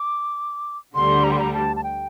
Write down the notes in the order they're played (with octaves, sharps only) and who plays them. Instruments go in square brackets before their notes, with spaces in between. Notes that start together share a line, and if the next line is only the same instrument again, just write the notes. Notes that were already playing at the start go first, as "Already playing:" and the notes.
Already playing: [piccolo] D6
[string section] D2 D3 G3 [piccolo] C6
[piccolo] A#5
C6
A#5
A5
A5
G5